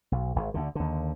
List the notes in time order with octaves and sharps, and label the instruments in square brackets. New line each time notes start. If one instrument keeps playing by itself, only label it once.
[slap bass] B1
G#1
D2 D3
D#2 D3